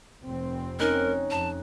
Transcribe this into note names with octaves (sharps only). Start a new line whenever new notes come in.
F1 C4
C#4 D#4 A#4 F#6
F2 A5